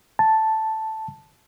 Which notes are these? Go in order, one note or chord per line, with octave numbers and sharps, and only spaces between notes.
A5